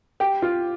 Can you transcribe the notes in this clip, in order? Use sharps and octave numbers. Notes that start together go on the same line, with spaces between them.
G4
F4